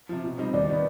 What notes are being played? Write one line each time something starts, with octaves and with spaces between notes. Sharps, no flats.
C3 F3
B2
G3 C4 D#4
D#2 D5
D#3 B3